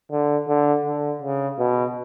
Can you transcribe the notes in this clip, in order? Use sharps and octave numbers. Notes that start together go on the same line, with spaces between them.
D3
D3
D3
C#3
B2